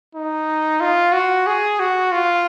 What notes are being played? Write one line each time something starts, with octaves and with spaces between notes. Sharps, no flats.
D#4
F4
F#4
G#4
F#4
F4